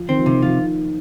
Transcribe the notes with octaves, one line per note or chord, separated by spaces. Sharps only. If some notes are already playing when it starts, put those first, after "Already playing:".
Already playing: F3
D#3 C4
F3
C3 D#3
F3 F4